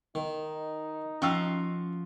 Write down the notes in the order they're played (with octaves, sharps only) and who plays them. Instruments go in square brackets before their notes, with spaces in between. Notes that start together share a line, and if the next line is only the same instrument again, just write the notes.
[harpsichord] D#3 [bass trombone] D#4
[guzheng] F3 F#4 F5 [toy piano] C#4 E6 [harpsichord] C#6